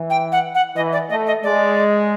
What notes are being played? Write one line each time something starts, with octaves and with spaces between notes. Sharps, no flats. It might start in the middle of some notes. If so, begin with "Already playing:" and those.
Already playing: E3
G5
F#5
F#5
E3 D#5
D5
A3 D#5
D#5
G#3 D5